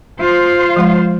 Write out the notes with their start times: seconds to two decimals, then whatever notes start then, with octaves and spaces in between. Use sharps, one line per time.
0.20 F4 C5
0.76 F3 G#3 F5